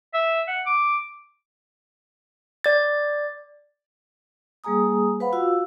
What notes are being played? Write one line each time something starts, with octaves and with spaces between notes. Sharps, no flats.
E5
F#5
D6
D5 A6
G3 A#3 G#4 G#5 A#5 D#6
B4 C5 F5 F#5 B5
F4 F#4 F5 E6